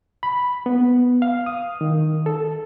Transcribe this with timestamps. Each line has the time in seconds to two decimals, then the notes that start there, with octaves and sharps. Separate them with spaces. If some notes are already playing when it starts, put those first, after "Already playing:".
0.23 B5
0.66 B3
1.22 F5
1.46 D#6
1.81 D#3
2.26 A4